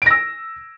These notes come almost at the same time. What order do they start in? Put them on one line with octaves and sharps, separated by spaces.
D7 A#6 E6